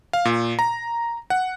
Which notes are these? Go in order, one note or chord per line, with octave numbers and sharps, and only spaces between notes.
F5
A#2
A#5
F#5